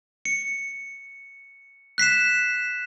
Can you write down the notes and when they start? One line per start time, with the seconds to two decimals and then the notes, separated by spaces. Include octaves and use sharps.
0.25 C#7
1.98 F#6 B6 C7 E7